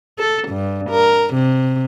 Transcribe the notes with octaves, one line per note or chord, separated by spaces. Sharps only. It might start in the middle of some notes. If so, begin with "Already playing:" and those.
A4
G2
A#4
C3